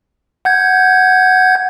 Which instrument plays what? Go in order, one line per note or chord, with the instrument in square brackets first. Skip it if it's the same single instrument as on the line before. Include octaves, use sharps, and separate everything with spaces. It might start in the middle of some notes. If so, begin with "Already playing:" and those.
[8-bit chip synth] F#5 G6 G#6